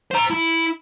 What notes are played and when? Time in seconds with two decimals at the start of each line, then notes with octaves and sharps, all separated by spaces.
0.11 C5 A#5
0.30 E4